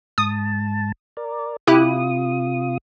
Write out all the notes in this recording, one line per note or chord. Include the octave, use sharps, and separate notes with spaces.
G#2 A5 D#6
A#4 D5
C3 E4 F4 G4 D#6 F#6